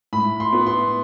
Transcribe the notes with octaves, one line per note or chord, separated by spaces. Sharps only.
A2 B5
C6
B3
C6